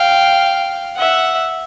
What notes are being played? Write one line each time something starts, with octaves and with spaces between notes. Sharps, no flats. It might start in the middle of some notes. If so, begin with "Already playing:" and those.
Already playing: F5 G5
E5 F#5